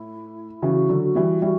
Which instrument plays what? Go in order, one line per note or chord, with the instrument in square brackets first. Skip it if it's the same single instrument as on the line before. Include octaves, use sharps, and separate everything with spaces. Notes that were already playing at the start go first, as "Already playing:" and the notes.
Already playing: [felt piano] A2 [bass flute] E4
[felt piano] C#3 E3 [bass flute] F#4
[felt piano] D3 F#3
[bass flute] F#4
[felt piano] E3 G3
[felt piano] E3 G3 [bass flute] F#4